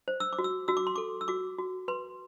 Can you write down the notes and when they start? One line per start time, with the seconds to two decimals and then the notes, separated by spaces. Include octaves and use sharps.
0.08 C5
0.20 E6
0.33 D6
0.39 F#4
0.44 E6
0.68 F#4 E6
0.77 D6
0.87 C6
0.96 A4 D6
1.21 E6
1.28 F#4 D6
1.59 F#4
1.88 B4 C6